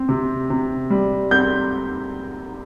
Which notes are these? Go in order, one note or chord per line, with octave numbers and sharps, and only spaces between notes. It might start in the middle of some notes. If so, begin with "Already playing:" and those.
Already playing: C4
C3
C3
G3
C4 G6